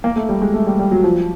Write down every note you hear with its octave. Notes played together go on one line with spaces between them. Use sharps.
A#3
A3
G3
G#3
A3
G3
G3
F#3
F3